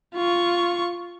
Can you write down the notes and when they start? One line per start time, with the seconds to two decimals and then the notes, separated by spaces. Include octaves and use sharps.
0.16 F4 C#6